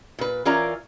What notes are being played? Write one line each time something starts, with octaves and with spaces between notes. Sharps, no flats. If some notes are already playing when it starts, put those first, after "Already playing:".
A#2 B4
E3 C#4 F4 A#4 D5 A#5